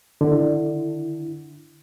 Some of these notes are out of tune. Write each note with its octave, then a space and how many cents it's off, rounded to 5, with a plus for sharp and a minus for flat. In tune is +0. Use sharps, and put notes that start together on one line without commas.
D3 +10 E4 +0